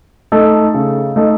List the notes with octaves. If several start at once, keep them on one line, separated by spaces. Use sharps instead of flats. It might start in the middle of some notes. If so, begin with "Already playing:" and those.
A3 D#4 A4
C#3
A3 D#4 A4